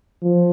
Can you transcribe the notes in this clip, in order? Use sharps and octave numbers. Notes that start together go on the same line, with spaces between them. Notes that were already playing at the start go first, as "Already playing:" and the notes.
F3